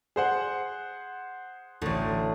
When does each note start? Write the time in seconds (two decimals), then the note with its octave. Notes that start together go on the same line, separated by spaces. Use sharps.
0.16 G#4 C5 F#5
1.82 A1 D2